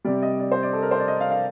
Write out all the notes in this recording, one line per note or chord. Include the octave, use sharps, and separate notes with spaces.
C3 G3 D5
D#5
D5
C5
D5
A4
A#4
C5
D5
D#5
F5
F5